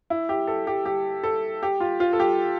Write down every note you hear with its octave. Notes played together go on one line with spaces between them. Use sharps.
E4
G4
A4
G4
G4
A4
G4
F4
F4
A4
G4